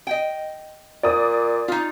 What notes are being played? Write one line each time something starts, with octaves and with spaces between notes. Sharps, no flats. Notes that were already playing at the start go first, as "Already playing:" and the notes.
D#5 G5
A#2 D5 D#6
D#4 F4